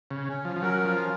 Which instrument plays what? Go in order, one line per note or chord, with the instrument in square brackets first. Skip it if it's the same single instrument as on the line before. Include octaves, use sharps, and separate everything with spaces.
[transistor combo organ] C#3
[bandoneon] C#4
[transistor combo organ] F3
F3
[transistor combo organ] F#3 [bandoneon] A#4
[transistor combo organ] F3
[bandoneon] F4